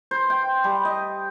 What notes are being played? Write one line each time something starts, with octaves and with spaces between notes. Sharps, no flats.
C5
G5
G3
D#5